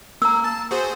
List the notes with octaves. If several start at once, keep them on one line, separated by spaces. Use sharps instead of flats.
A#3 A#5 E6
A5
F#4 G#4 C5